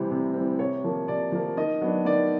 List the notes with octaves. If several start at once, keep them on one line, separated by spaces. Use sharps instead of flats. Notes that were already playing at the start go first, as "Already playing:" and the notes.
Already playing: C3 E3 G3 C4
C3
E3 G3 C4
C3 C#5
F3 A#3
C3 D5
F3 A#3
D#3 D#5
F#3 B3 D4
D#3 D5